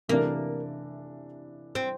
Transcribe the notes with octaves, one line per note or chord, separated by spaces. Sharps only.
C3 E3 A3 A#3 D4
C4